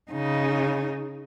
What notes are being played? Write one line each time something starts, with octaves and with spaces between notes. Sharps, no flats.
C#3 D#4